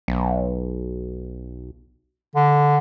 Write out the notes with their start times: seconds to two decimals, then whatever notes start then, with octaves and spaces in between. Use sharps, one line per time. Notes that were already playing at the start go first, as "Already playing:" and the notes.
0.08 B1
2.36 D3